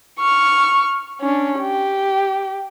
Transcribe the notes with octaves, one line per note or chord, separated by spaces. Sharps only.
C#6 F6
C#4 D4
G4